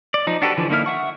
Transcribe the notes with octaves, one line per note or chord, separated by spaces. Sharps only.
D5
F3 D#4
D4 F#4 G4 A4 B4
D3 E3 F3
D3 A#3 D#4 E4 F6
E5 F#5 C#6